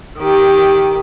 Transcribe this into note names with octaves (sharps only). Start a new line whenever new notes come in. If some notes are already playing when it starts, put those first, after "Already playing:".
D#3 G4